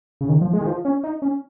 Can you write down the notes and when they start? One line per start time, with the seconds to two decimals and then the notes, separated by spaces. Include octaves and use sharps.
0.21 C#3
0.29 D#3
0.41 F3
0.53 G#3
0.61 D#3
0.66 F3
0.85 C#4
1.04 D#4
1.22 C#4